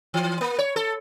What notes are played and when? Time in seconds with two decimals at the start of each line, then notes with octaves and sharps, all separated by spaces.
0.14 E3
0.41 A#3
0.59 C#5
0.76 A4